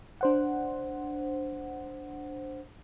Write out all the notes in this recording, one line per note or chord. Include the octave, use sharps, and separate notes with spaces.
D4 C5 F#5